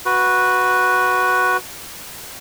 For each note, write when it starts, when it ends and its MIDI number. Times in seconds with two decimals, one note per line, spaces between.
0.06 1.57 66
0.06 1.57 71